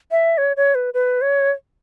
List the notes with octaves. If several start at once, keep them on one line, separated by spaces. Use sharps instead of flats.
E5
C#5
C#5
B4
B4
C#5